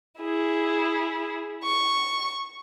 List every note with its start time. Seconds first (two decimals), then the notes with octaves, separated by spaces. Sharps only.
0.20 E4 G#4
1.64 C#6